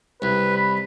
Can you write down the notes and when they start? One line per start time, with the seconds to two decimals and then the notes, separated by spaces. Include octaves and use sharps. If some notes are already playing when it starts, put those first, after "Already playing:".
0.22 C2 B4
0.56 B5